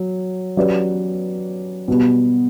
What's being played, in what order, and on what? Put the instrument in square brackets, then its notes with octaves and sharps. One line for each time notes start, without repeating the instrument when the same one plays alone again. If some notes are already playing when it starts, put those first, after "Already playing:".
Already playing: [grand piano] F#3
F#3 C#4 G4 B4 D5
B2 G3 B3